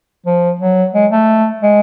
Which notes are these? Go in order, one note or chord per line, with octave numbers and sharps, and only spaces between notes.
F3
F#3
G#3
A3
G#3